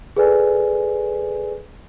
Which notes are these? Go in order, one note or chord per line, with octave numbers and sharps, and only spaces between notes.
G#4 A4 B4 D5 G#5